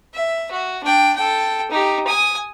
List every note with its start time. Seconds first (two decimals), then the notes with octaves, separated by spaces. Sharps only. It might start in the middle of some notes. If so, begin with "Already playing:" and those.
0.14 E5
0.51 F#4
0.84 D4 G5
1.15 A4 G5
1.71 D#4 G4
2.07 G#5 D#6